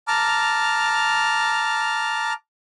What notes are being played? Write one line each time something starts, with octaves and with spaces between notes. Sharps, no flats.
A5 A#5 D6 F6